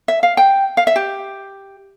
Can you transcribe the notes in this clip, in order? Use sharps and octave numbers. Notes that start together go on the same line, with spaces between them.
E5
F5
G5
F5
E5
G4